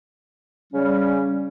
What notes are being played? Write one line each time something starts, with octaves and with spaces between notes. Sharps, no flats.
C#3 G3 C#4